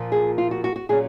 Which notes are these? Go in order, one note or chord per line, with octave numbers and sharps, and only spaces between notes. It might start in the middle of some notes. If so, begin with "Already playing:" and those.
Already playing: A#2 F3 A#3
G#4
F4
F#4
F#4
F#4
A#2 F#3 C#4 G#4